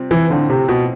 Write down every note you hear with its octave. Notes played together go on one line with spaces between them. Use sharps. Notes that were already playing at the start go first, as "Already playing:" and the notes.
Already playing: C3 G3 C4 F4
E3
A2 D3 F3 C4 F4
C3
B2